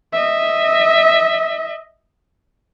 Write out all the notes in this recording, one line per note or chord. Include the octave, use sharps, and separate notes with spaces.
D#5 E5